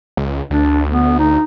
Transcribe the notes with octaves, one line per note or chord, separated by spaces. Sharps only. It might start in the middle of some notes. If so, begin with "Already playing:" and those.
C#2
D2 D4
B3
D#4